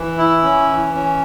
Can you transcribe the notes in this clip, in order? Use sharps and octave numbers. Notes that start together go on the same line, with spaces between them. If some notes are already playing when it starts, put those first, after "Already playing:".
Already playing: E3
E4
C#4
E3
C#4